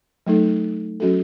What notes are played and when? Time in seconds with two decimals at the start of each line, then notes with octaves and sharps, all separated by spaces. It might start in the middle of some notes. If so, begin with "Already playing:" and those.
0.26 F#3 A3 D#4 A4
1.00 F#3 C#4 F#4 A4